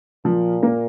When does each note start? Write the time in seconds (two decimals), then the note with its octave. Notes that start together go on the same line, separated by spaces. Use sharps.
0.25 A#2 F3
0.63 A#3